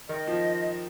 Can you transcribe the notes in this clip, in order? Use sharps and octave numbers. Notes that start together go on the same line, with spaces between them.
D#3 D#5
F3